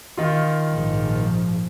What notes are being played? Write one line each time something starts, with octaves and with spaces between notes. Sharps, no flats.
D#3 F4
A#1 G#2 F3